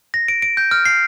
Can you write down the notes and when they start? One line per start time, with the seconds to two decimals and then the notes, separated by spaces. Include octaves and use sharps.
0.14 A#6
0.28 D7
0.42 D7
0.57 G6
0.71 F6
0.85 C7